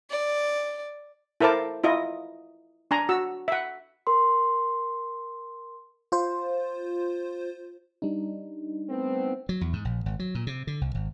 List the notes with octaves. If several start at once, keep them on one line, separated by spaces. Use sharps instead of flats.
D5
E4 A4 A#4 C5 A5 D6
E4 F4 D#5
D4 G#5 A#5
F#4 E6
E5 F#5
A#4 C6
F4 C5
G3 D4 D#4
A3 B3 C4
F#3
E2
G#2
A#1
G#1
F#3
A#2
C3
D3
C2
G#1